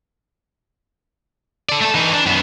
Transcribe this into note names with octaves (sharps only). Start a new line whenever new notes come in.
A4 D5
A3 A4
E3 D#4
D4
F#2 B3